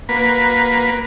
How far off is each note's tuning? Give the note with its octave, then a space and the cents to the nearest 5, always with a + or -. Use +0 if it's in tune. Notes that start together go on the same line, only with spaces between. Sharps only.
A#3 +10 F#4 -5 B4 +0